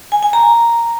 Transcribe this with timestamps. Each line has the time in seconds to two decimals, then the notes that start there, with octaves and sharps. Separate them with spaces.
0.12 G#5
0.23 G#5
0.33 A#5